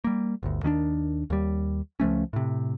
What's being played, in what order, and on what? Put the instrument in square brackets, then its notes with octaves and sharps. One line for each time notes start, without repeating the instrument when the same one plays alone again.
[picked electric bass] G3 A#3
G1 D2
D#2 D#3 C#4 D4
D#2 G3
C#2 F3 A3 C#4
A2 C3